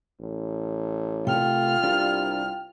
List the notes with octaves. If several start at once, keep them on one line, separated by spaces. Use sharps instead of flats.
A1
C3 A3 F4 G5 F6
C2 D4 G4 A#4